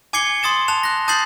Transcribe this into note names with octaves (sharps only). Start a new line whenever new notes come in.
G#5 D6 G#6 C7 C#7 G7
C6 D#6 A6 E7
A5 F#6 E7 F7
F#6 A#6
A5 D#6 G6 A6 C7 F#7